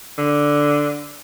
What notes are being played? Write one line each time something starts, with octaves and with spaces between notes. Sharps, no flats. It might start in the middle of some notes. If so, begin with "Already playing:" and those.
D3